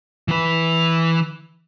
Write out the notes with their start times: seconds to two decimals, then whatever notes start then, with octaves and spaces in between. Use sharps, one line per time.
0.28 E3 B4